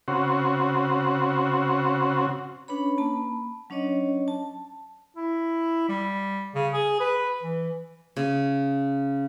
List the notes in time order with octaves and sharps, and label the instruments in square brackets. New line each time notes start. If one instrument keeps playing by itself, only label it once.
[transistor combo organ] C#3 C4 F#4
[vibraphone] C#4 D4 B4 C#5 B5
A#3 A5 B5
F#3 C#4 D4 C#5 D#5
A5
[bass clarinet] E4
G3
C#3
G#4
B4
E3
[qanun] C#3